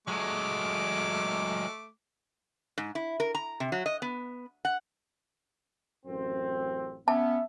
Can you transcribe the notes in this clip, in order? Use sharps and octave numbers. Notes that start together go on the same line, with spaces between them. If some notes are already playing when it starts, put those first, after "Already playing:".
F#3 G#3 A3 D6
G#2
E4
A#4
A#5
C3
F#3
D#5
B3
F#5
A1 F#2 C4
B3 C#4 E5 A5